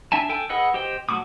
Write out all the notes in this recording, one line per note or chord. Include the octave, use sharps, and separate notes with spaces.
D4 E5 G#5 A5
A4 G5 G#5
G#4 B4 D#5 F#5 E6
G4 C5 D#5 G5
F#3 A3 F#4 D6 D#6